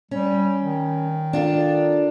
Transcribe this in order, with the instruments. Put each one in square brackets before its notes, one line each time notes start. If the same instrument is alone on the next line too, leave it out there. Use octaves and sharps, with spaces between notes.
[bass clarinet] G3 [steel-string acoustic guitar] C#4
[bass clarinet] D#3
[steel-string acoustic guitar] D4 F4 A4